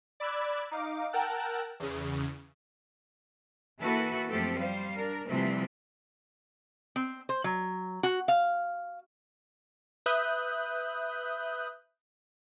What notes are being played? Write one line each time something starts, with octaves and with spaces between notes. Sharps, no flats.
D5 B5 E6 F#6 G#6
D#4 F5 D6
A#4 F#5 G5 A5 E6 F#6
E2 C#3
E3 A#3 E4 F#4 A4 B4
F#2 F3 A3 C4 G4 A4
G3 C5 F5
D4 A#4
C3 E3 F3 G3 A3 C4
C4
C5
F#3
F#4
F5
B4 E5 D#6 F#6 G6